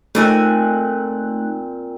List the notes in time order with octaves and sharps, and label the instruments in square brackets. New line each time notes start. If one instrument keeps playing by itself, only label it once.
[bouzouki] A#2 C4 G#5 [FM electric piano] A3 D#4 F#6